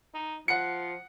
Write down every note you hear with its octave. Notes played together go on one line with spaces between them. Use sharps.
D#4
F3 F#5 C#7